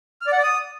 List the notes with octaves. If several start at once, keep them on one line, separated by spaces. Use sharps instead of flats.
F6
D5
F#5
D5
D#6